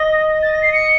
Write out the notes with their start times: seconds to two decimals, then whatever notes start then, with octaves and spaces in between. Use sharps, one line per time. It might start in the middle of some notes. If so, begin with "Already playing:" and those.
Already playing: D#5
0.43 A6
0.52 A#6
0.62 C7
0.73 C#7